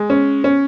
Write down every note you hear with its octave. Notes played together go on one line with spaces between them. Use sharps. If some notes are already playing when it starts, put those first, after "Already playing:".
Already playing: G#3
C#4
C#4